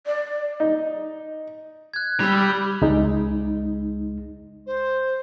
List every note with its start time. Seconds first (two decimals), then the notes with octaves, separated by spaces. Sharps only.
0.06 D5
0.60 D#4
1.94 F#6 G#6
2.20 G3 B5 E6
2.82 C#2 G#3 D#4
4.66 C5